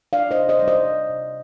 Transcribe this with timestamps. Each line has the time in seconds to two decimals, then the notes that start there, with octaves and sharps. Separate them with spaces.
0.13 D4 D5 F5
0.31 C5 D#5
0.38 C3
0.49 C5 D#5
0.59 G3 D5
0.68 C5 D#5
0.86 G3
1.09 C3